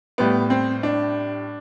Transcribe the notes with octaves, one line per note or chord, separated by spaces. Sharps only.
A2 G3 B3
C4
D4